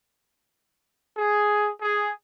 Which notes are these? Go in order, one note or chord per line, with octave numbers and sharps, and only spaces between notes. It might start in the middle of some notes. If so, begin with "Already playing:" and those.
G#4
G#4